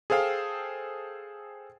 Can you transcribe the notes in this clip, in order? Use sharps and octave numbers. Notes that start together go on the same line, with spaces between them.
G#4 A4 C5 F5 G5